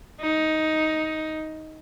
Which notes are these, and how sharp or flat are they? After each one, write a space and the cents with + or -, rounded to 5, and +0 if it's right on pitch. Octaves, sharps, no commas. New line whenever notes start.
D#4 +10